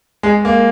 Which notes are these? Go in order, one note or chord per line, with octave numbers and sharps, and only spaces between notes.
G#3
A#3